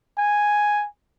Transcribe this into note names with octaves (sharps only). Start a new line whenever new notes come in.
G#5